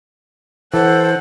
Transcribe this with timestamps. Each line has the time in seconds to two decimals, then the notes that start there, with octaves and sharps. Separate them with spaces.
0.74 E3 A4 C5 F#5